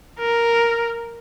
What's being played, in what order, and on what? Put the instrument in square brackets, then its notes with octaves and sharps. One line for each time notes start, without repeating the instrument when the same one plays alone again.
[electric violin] A#4